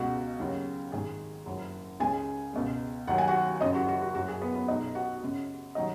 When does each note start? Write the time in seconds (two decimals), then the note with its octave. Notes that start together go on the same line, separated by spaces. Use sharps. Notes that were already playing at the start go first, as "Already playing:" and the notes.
Already playing: C#2 B2 G#3 F#4
0.40 D#2 C#3 F#3
0.92 G#1 G#2 D#3 G#3 G#4
1.46 F#1 F#2 F#3
2.00 C#2 C#3 G#3 G#4 G#5
2.53 C#2 B2 G#3
3.07 D#2 D#3 F#3 F#5
3.18 G#5
3.27 F#4 F#5
3.61 F#1 F#2 C#3 F#3 D#4 D#5
3.75 F#4
3.88 F#4
4.02 F#4
4.14 F#1 F#2 F#3 F#4
4.28 G#4
4.42 B3 B4
4.55 B3 B4
4.68 B1 B2 G#3 D#4 D#5
4.95 F#4 F#5
5.22 F#2 C#3 G#3
5.75 D#3 F#3 D#4 D#5